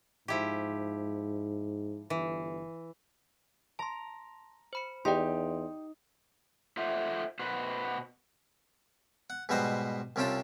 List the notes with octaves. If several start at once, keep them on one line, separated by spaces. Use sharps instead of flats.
G#2 F3 E4 G4
G1 E3
A5 A#5 C6
C5 B5 C#7
E2 D#4 G4 D5 G5 C6
F4 A4 C5 D5 E5 F#5
B2 F#4 B4 C5
F#5
G#2 B2 G3 B4 C5 D#5
C2 C3 C#4 F4 G5 A5